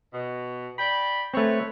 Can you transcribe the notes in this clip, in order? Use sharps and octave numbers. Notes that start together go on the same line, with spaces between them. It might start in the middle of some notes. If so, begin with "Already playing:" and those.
B2
D5 G5 B5
A3 C4 B4 C#5